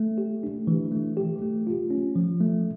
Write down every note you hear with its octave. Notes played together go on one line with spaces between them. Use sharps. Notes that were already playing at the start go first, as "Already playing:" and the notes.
Already playing: A3
G4
D4
E3
A3
G4
A3
F4
C#4
F3
A3